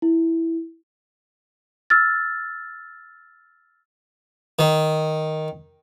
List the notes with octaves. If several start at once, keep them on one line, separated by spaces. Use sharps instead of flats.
E4
E6 F6 A6
D#3